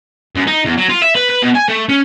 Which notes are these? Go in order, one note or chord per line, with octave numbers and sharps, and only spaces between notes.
F#2
D#4
E2
F#3
F4
E5
B4
B4
B2
G#5
A3
C#4